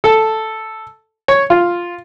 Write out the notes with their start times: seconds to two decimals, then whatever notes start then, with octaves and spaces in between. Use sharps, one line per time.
0.04 A4
1.28 C#5
1.50 F4